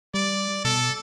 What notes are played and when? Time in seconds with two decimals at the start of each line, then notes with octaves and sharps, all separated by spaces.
0.14 G3 D5
0.65 B2 A4